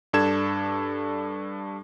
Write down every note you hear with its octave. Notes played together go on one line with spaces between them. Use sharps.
G2 D4 A4 G#6 E7